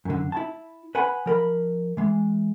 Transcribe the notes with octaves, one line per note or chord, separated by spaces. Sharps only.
F#2 D3
E4 A5
B4 F#5 G#5 B5
F3 A#4 B5
E3 G#3